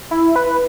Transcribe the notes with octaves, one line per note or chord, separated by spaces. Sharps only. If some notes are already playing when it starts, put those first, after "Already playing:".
E4
B4